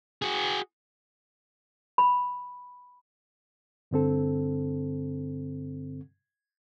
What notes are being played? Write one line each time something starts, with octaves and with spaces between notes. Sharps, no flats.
F#4 G#4
B5
G2 D3 C4 A4